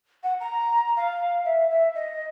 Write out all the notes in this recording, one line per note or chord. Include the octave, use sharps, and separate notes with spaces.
F#5
A#5
F5
E5
E5
D#5